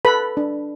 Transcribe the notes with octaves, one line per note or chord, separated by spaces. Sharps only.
A4 B4 B5
D4